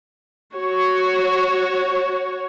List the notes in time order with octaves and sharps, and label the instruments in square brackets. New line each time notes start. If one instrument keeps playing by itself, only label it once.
[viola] F#4 C#5